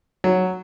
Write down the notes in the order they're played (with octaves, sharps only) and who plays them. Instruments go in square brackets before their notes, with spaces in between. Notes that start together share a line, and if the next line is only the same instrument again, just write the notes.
[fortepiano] F#3